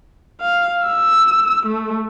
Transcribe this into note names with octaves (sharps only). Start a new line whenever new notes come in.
F5
E6
A3